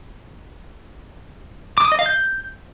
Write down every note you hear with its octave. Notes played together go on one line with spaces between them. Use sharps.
D6
D#6
D#5
F5
G6